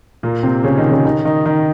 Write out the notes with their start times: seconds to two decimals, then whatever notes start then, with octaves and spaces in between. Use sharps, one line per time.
0.23 A#2 A#3
0.43 C3 C4
0.64 C#3 C#4
0.77 D#3 D#4
0.91 C#3 C#4
1.05 D#3 D#4
1.25 D#3 D#4
1.46 D#3 D#4